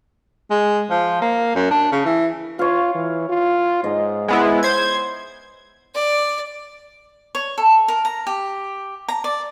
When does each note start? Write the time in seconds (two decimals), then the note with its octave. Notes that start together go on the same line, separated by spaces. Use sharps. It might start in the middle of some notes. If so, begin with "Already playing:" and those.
0.50 G#3
0.90 F3
1.21 A#3
1.55 F#2
1.71 D4
1.92 C#3
2.05 E3
2.59 F4 C#5 F5
2.95 E3
3.29 F4
3.84 G#2 D#5
4.28 G#3 B3 E4
4.63 C5 G#6
5.95 D5
7.35 C#5
7.58 A4
7.88 A#4
8.05 A#5
8.27 G4
9.09 A#5
9.24 D5